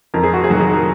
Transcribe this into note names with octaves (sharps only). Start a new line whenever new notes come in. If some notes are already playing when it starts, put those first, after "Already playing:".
F2 A#4
G#4
F#4
G#4
D#3 F#3
G#4
A#4